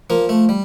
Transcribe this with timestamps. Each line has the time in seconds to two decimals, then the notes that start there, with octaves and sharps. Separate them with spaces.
0.10 F3 A#3
0.29 A3
0.49 G3